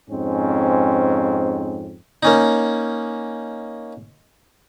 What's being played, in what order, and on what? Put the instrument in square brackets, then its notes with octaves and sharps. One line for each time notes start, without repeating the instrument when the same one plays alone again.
[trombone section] F2 G#2 C4 C#4
[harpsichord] A#3 C#4 D#4